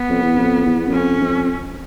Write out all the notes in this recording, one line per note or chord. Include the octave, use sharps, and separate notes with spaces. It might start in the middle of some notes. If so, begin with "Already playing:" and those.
Already playing: B3
F2
E2
F2
E2
F#2
F2 C#4
F2